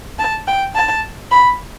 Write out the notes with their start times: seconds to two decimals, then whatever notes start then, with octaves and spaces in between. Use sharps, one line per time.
0.19 A5
0.48 G5
0.75 A5
1.31 B5